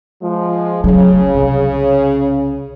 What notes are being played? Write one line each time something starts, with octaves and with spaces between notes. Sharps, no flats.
F3 G#3
C#3 F#3 A3
C2